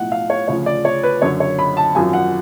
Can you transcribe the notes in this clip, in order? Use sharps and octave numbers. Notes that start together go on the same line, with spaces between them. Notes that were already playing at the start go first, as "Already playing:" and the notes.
Already playing: B1 A2 F3 F#5
F5
C#5
D2 C#3 F3 C#5
D5
C#5
B4
F#1 F#2 D3 C#5
C#5
B5
A5
G#1 F#2 F3 G#5
F#5